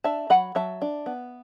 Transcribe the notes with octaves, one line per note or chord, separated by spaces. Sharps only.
D4 E5 A5
F#3 F#5 B5
F#3 E5 A5
D4
B3